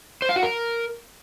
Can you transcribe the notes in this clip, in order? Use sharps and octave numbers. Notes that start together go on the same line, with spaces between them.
C5
F5
F#4
A#4